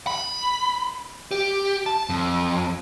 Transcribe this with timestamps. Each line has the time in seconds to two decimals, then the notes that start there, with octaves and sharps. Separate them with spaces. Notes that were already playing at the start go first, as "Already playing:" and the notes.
0.07 B5
1.31 G4
1.86 A5
2.09 F2